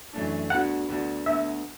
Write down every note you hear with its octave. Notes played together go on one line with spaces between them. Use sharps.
F#2 E3 A3 D4
D2 D3 B3 D4 F#4 F#5
D2 D3 B3 D4 F#4
D2 D3 B3 E5